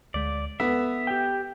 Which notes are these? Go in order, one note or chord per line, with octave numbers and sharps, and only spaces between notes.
D2 G#3 D5
B3 A4 B4 E5
G4 G5